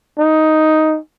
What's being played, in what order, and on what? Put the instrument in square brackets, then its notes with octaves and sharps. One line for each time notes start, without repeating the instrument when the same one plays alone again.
[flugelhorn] D#4